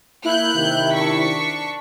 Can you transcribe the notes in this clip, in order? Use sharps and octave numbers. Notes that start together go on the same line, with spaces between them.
A#3 E4 F#6 G6
C3 D#3
D4 C#6 B6